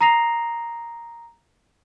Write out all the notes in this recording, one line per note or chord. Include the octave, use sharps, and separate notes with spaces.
A#5 D#6 A#6 C7 F7